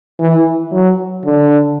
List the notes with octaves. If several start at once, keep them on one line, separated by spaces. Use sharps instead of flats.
E3
F#3
D3